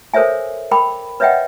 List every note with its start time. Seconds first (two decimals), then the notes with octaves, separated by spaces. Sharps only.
0.14 A4 A#4 C5 C#5 E5 G#5
0.71 A#4 G5 B5 D6
1.20 B4 C#5 D#5 E5 F#5 G5